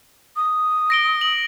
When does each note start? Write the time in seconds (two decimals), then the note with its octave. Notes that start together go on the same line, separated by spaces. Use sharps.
0.36 D#6
0.90 A#6 D7 G7
1.21 F#7